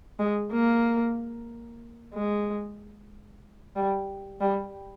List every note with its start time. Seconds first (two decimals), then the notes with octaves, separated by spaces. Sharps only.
0.19 G#3
0.51 A#3
2.14 G#3
3.76 G3
4.41 G3